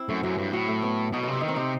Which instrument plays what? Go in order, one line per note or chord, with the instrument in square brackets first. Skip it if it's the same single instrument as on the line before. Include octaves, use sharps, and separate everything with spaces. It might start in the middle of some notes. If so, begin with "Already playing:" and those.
Already playing: [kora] C4 E4
[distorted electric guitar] F#2 [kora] A3
[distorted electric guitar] F#2 [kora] F#3
[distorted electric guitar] G2
[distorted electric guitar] A2 [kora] F#3
[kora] A3
B3
[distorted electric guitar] B2 [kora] D#4
[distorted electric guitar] C3 [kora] D#4
[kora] E4
[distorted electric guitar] D#3 [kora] D#4
[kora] C4
[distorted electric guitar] C3 [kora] D#4